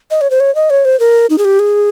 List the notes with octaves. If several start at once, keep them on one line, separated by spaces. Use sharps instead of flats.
D#5
C#5
C5
C#5
D#5
C#5
C5
A#4
D#4
G#4
G4
G#4